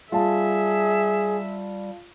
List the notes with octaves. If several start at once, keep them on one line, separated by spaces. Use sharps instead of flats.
G3 F4 G#4 E5 A5